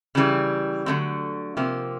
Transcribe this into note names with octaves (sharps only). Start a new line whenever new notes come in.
C#3 E3 G3
D3 F#3 A3 C4
C3 F3 A#3